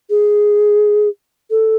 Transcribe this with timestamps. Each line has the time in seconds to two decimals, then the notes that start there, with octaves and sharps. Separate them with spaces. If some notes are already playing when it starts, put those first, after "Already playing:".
0.10 G#4
1.50 A4